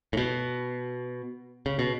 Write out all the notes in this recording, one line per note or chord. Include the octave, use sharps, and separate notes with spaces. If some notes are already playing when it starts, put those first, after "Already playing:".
A2
B2
C#3
B2